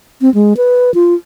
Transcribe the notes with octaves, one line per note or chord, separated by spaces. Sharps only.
C4
G#3
B4
F4